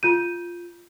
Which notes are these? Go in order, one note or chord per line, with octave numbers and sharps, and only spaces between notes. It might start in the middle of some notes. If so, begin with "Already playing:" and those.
F4 G6 D#7